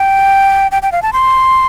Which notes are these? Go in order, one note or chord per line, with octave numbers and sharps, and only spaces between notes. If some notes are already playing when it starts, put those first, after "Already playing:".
Already playing: G5
G5
G5
F5
A5
C6